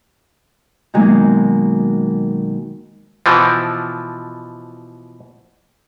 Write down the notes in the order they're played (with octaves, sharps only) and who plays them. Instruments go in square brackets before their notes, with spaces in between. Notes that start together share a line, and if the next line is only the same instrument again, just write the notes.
[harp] B2 D#3 F#3 G#3 A#3
[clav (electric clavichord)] B2 E3 F3